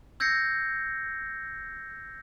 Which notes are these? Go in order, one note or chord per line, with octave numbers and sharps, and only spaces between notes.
E6 G6 G#6 A#6 C7 C#7